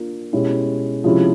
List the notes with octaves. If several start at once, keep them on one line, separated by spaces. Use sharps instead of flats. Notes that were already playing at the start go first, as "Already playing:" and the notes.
Already playing: A#3 D4 F4 A#4
B2 G#3 C#4 E4 G4
C3 F3 G#3 C#4 E4